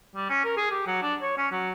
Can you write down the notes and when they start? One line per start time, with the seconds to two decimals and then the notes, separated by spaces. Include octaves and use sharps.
0.15 G3
0.29 C#4
0.44 A#4
0.57 G#4
0.71 G4
0.87 F#3
1.02 D4
1.22 C#5
1.38 C#4
1.52 F#3